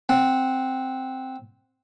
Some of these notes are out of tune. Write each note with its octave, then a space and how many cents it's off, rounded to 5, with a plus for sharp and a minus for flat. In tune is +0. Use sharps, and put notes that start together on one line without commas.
C4 +0 F#5 -5